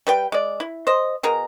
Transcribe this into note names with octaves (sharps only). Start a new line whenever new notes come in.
G3 B4 G5
G#3 D5
E4
C5 D#5
B2 G#4 A#4 A#5